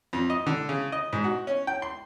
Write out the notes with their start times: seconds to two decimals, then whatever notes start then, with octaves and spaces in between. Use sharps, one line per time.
0.13 F2
0.30 D#5
0.46 D3
0.69 C#3
0.92 D#5
1.13 G#2
1.24 F#4
1.47 C#4
1.67 G5
1.82 C6